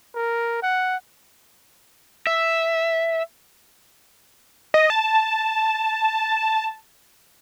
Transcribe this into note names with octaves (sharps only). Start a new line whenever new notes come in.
A#4
F#5
E5
D#5
A5